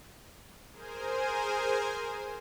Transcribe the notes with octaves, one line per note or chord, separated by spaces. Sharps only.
G#4 A#4 C5 G#5